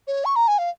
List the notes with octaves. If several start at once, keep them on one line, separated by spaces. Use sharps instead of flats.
C#5
C#6
A#5
G#5
F5